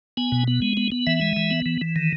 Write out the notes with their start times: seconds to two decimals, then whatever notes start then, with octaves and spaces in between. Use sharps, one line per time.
0.17 B3 G#5
0.32 B2
0.48 B3
0.62 G#3
0.77 B3
0.92 B3
1.07 E3 E5
1.21 G#3
1.37 E3
1.51 B3
1.66 E3
1.81 E3
1.96 D#3